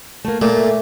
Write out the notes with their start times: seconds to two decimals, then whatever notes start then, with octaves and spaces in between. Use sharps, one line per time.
0.25 A3 A#3
0.42 A#2 A3